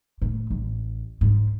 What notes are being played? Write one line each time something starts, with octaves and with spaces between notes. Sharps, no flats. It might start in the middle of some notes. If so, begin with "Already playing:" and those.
A2
A1
G#2